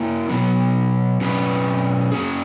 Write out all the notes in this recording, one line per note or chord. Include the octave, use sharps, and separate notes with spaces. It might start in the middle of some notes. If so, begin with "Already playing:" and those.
Already playing: A#3 E4 A#4
B2 F#3 B3
B2 F#3 C#4 G#4 B4
A#3 C#4 G#4